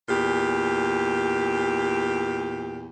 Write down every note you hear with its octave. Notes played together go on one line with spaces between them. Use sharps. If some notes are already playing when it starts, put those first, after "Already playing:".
E2 A#2 G4